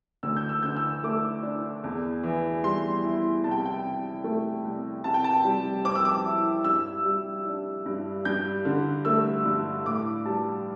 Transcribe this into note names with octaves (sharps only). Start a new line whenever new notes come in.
D2 E6
G6
E6
D3 G6
E6
A3 D6
D4
E2
E3
G3 C6
E4
C2 A5
G5
G5
C3
A3
C2
C3 A5
G5
A5
G3
C4 D6
E6
D6
E4
G2 E6
G3
D4
G2
G2 G6
D3
A3 E6
G2
A2 D6
G3 A5